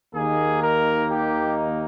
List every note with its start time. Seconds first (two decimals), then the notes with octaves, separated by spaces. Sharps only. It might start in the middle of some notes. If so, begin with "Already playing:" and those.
0.14 D#2 D#3 A#3 D#4 G#4
0.62 A#4
1.10 G4